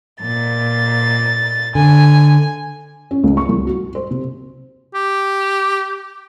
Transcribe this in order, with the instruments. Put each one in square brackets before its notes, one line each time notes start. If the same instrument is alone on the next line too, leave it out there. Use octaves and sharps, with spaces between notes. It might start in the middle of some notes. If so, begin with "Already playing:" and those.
[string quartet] A#2 A6
[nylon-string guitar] D3 [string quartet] G#5
[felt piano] C#4
C#2
C#6
C2
F#4
C5
C3
[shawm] G4